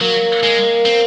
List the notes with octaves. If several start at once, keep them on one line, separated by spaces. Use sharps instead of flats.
F#3 A#3
G#3
C4